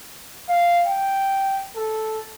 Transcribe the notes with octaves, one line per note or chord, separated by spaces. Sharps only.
F5
G5
A4